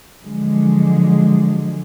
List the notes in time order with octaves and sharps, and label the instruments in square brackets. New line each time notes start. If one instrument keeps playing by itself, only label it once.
[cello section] D3 F3 F#3 G#3